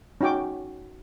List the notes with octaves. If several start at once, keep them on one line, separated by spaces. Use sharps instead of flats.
C#4 D#4 F#4 G5 D6